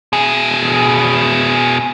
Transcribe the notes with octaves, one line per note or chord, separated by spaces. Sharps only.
B2 G#4